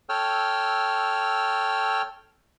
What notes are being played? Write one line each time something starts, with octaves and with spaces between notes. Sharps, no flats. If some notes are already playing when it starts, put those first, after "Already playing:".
A4 C#5 G5 E6 F6